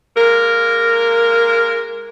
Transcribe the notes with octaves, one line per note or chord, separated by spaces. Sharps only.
G#3 A#3 A#4